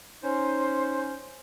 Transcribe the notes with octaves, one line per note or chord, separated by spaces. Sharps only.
C#4 D#4 C5